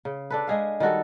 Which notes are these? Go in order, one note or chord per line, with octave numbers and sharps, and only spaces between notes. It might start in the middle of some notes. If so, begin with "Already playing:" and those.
C#3
D4 A4 B4
G#3 G#4 F5
D#3 G3 F#4 A4